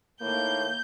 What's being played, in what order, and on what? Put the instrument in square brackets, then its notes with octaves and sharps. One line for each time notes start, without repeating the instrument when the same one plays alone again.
[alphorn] A2 [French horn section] D#3 A#3 [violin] G6